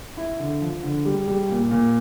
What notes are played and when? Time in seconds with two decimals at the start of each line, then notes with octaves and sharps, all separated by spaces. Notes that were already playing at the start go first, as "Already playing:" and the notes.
0.17 E4
0.40 D3
0.61 F3
0.83 D3
1.05 G3
1.28 G3
1.49 A#2
1.71 A#2